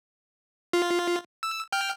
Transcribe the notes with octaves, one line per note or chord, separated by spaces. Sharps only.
F4
E6
G5 F6